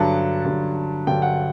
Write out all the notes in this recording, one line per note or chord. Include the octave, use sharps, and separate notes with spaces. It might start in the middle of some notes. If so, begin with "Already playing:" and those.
Already playing: G2 D3 F#3 A5
G2 D3 F#3
G2 D3 F#3 G5
F#5